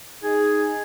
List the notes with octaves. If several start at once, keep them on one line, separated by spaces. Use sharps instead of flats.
D#4 G#4